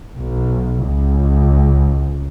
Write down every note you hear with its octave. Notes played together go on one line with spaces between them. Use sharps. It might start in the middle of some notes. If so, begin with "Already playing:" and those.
B1
C#2